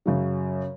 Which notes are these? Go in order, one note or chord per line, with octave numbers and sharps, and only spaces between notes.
F#2 C#3 F#3